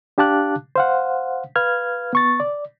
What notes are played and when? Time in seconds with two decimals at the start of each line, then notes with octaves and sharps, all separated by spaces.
0.18 D4 G4 F5 A5 D6 F#6
0.76 C5 F5 F#5
1.56 B4 F5 F6 G#6
2.13 B3 C#6 A6
2.40 D5